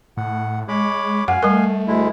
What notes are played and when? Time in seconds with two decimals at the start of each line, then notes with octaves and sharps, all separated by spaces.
0.17 A2 F#5
0.68 G#3 C#5 B5 D6
1.28 F#2 F5 F#5 G#5
1.43 G3 A3 A#4
1.87 D2 G#3 E4